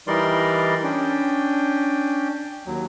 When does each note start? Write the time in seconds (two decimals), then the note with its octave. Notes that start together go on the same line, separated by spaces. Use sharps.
0.07 E3 G3 D#4 A#4 D5 C6
0.84 C#4 D4 G5
2.66 D#2 F#3